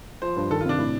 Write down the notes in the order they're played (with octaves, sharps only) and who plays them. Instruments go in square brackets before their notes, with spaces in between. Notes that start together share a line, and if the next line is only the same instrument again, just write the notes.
[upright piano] F3 [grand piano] C5
[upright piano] G2
[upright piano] D#3 [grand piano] A4
[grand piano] F4
[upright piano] C3 [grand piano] D4
[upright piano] A2